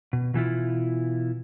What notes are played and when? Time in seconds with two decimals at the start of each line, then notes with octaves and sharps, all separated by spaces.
0.13 B2
0.34 B2 E3 E4 F4